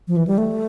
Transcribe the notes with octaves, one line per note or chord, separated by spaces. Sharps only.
F3
E3
G3
A3